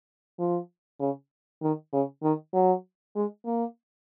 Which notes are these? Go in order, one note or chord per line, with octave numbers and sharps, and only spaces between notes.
F3
C#3
D#3
C#3
D#3
F#3
G#3
A#3